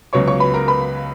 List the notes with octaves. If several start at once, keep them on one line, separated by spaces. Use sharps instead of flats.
C#2 C#3 F#3 B3 C#5 C#6
C#5 C#6
B4 B5
A#4 A#5
B4 B5